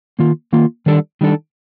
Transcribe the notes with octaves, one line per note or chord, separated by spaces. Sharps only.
D#3 A#3 F4
D#3 A#3 F4
D#3 G3 D4 A4
D#3 G3 D4 A4